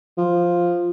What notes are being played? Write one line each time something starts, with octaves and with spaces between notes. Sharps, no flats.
F3